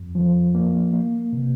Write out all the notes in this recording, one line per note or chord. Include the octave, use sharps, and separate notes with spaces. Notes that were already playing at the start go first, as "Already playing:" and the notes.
Already playing: F2
F3
A#3
A#3
C3